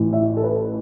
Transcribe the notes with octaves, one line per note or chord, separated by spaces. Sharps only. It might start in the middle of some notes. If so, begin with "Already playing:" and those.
Already playing: A1 A2 E3
E5
A4
B4